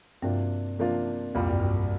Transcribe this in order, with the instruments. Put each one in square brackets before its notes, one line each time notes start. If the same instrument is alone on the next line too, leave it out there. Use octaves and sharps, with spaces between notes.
[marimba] G2 [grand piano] C3 F3 A#3 D4 F4
[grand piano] C3 F3 A#3 D4 F4
[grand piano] C2 A#2 G3 [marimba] F2
[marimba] G2
G2